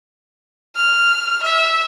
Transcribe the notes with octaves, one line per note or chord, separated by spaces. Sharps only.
F6
E5